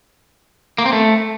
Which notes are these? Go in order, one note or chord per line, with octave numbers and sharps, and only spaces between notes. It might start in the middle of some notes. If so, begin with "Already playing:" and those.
A#3
C4
A3